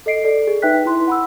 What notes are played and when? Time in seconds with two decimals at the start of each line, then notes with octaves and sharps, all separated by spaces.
0.06 A4 D#5 C7 D7
0.24 A4 D5
0.47 G#4
0.62 D#4 B4 E5 G5 F#6 B6
0.86 E4 C6
1.07 F#5 B5 E6